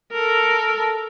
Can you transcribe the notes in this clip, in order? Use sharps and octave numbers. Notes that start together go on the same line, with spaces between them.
A4 A#4